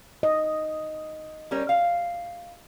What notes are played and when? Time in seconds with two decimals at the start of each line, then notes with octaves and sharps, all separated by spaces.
0.23 D#5
1.51 G3 C#4 A#4
1.69 F5